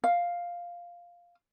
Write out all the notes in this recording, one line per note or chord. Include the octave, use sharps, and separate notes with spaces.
F5